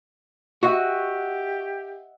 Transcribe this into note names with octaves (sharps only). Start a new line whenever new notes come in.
F#4 G4 D#5 E5 F#5